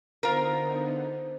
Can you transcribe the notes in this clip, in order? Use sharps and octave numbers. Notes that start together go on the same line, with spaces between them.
D3 B3 D#4 F4 A#4 C5